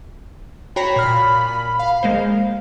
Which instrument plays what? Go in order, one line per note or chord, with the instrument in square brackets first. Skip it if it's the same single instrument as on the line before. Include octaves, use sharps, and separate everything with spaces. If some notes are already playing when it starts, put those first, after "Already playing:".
[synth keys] F#4 C#5 C7 [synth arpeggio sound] G5 A#5 [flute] B5
[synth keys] A#2 F6
F5
[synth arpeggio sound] G#3 A#3 C5